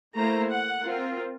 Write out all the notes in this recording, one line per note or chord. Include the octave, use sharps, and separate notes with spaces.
A3 A#3 E4 C5 A#5
F#5
C4 F4 A#4